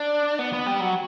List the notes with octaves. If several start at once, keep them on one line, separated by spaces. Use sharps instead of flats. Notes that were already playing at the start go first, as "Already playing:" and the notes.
Already playing: D4
B3
B3
G3
F#3